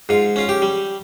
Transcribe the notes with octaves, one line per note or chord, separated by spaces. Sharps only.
G#2 F4
C#4 F4
G4
G3